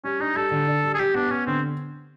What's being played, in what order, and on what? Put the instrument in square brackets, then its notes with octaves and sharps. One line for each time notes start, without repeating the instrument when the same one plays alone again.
[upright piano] G3 [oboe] C#4
[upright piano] D4 [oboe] D#4
[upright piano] G3 [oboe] A4
[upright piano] D3
D4
G3
[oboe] G#4
[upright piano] G3 [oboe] G4
[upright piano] B3 [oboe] D4
[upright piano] B3 [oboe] C#4
[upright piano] D3 [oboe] C4